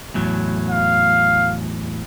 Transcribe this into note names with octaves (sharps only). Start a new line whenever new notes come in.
E2 A2 F#3
F5